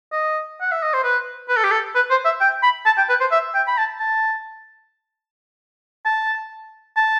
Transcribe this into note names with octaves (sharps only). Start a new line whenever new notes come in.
D#5
F#5
E5
D#5
C5
B4
B4
A4
G4
A4
B4
C5
E5
G5
B5
A5
G5
B4
C5
E5
G5
B5
A5
A5
A5
A5